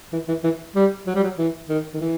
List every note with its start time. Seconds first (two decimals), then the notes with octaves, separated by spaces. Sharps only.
0.13 E3
0.28 E3
0.44 E3
0.75 G3
1.07 F#3
1.16 G3
1.24 F#3
1.38 E3
1.69 D#3
1.94 D#3
2.00 E3